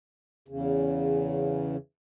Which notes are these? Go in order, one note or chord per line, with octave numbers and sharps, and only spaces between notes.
E2 C#3